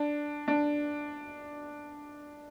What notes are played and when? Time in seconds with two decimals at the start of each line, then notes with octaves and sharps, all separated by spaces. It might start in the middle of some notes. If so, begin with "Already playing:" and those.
Already playing: D4
0.48 D4